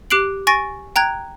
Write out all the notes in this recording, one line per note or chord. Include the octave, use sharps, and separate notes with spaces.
G4 D6 F#6 C7 D7 F#7
G#5 C#6 A6 A#6 D7
G5 A#5 F#6 G#6